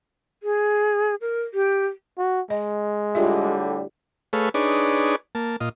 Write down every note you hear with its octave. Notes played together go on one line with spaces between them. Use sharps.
G#4
A#4
G4
F#4
G#3 D#5
A2 D3 G3 F4 G#4 E5
A3 G#4 A4 B4 C#5 F5
D4 D#4 G#4 B4 C#5 D5
A#3 A5
A#2 F4 D#5